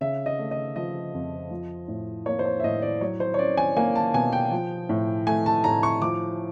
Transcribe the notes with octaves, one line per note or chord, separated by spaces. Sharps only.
C#3 E5
D#5
A3
D#5
F3 D#5
F2
F3
A2
A#3 C#5
C5
C#5
E5
A2 D#5
D5
F#3 C#5
C5
C#5
C#4 D5
G#5
A#3 G#5
A5
B2 G#5
G5
F3
A2
A3 G#5
A5
A2 A#5
C#6
F3 D6